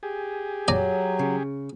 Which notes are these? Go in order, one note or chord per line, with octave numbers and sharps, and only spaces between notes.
G4 G#4
F#3 D5 G#5 A#5
C#3